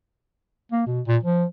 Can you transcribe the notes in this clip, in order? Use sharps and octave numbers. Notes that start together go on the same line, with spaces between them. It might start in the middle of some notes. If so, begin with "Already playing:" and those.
A#3
B2
A#2
F3